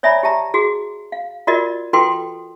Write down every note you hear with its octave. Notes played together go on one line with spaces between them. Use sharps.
C#5 D5 E5 G#5 A#5 B5
G4 E5 A5 A#5
F#4 G#4
F5
F4 F#4 A#4 D5 D#5
F4 F#4 A4 B4 G5 C6